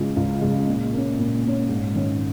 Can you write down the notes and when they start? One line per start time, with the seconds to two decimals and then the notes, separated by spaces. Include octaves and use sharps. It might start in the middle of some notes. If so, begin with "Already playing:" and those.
Already playing: C#3 G#3 F4
0.16 C#2
0.42 C#3 G#3
0.68 A#2
0.93 A#3 C#4
1.19 A#2
1.44 A#3 C#4
1.69 G#2
1.95 D#3 C#4